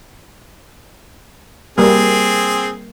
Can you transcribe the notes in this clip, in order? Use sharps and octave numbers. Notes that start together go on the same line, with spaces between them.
G3 A#3 C4 G#4